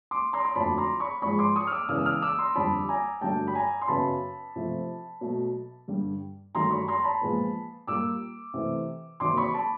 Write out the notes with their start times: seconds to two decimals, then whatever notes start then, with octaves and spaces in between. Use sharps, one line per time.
0.11 C6 D6
0.33 A#5 C6
0.45 C6
0.55 F2 D3 F#3 A3 A5 B5
0.78 A#5 C6
1.00 B5 C#6
1.22 G#2 F3 G#3 B5 C#6
1.38 C6 D6
1.56 C#6 D#6
1.67 F6
1.72 D6 E6
1.89 C#3 E3 G#3 B3 D#6 F6
1.98 E6
2.06 D#6 F6
2.22 D6 E6
2.39 A#5 C6
2.56 F2 D3 G3 A5 B5
2.89 G#5 A#5
3.21 G2 D3 F#3 A3 G5 A5
3.47 B5
3.55 G#5 A#5
3.82 C6
3.88 F#2 C#3 F#3 B3 A5 B5
4.56 C3 F3 A3
5.21 B2 F#3 A3
5.88 G2 D3 G3
6.55 G2 D#3 F#3 A3 A#5 C6
6.71 B5 C#6
6.88 A#5 C6
6.99 A#5
7.04 A5 B5
7.21 A#2 F3 G#3 B3
7.87 A#2 G3 A#3 D6 E6
8.54 C3 E3 A3
9.20 C3 D#3 F#3 A#3 C6 D6
9.37 B5 C#6
9.54 A5 B5